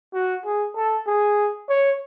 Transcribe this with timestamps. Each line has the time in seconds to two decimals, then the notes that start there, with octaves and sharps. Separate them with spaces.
0.14 F#4
0.45 G#4
0.76 A4
1.07 G#4
1.69 C#5